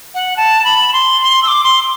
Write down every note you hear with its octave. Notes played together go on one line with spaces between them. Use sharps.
F#5
A5
B5
C6
C6
E6
D6
C6